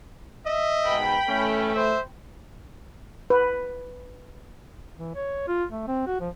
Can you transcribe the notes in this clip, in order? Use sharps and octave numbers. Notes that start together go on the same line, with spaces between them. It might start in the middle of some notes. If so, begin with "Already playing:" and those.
D#5 E5
G#2 B2 G5 B5
A2 E3 A3 C#4
C5 E5
B4
E3
C#5
F4
A3
C4
F#4
F3